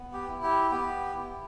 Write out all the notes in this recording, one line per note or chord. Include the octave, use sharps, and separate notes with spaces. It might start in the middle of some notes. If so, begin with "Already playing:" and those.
Already playing: B3
G4
E4
G4
B3 G4
E4